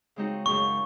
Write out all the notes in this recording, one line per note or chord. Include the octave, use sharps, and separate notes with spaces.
C#3 G#3 C4 D#4 F#4
F#2 C#3 G#3 C#4 C#6